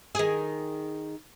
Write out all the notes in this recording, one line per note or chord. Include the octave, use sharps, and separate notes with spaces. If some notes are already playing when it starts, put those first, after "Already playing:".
D#3 G#4